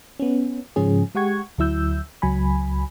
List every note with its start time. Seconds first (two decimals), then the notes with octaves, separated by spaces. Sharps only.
0.20 B3 C#4
0.76 G#2 C#3 F3 C#4 G#4
1.15 G#3 G4 F#5 C#6 G#6
1.58 D2 F#3 E4 E6 G6
2.22 C#2 F#3 G#5 B5